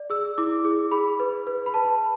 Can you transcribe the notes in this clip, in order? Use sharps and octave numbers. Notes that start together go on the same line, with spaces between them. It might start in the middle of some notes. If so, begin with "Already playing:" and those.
Already playing: D5
G#4 E6
E4 D6
G#4
G#4 B5
B4
B4
B5
B4 A5